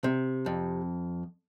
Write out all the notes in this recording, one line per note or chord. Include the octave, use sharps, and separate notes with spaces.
C3
F2